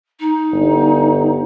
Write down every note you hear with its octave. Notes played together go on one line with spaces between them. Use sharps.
D#4
G1